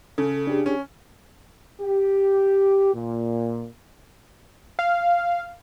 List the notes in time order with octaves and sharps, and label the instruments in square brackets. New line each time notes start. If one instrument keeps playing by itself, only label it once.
[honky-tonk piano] C#3 [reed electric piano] A4
[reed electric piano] D4 G4 G#4
[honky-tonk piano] C#4
[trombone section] G4
A#2
[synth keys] F5